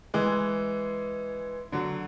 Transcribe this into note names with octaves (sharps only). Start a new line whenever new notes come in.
E3 G#3
D3 F#3